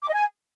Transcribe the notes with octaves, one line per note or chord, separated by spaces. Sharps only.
D6
D#5
G#5